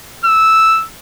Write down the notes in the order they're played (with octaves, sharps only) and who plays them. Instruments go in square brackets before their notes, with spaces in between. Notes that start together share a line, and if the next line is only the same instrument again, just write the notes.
[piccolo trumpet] E6